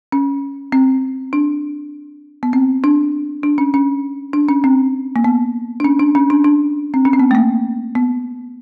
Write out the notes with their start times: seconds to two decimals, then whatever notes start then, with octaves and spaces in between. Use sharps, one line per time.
0.12 C#4
0.72 C4
1.33 D4
2.43 B3
2.53 C4
2.84 D4
3.43 D4
3.58 C#4
3.74 C#4
4.33 D4
4.49 C#4
4.64 C4
5.16 A#3
5.24 B3
5.80 D4
5.84 C#4
6.00 D4
6.15 C#4
6.30 D4
6.44 D4
6.94 C4
7.05 C#4
7.13 C4
7.19 B3
7.31 A3
7.35 A#3
7.95 B3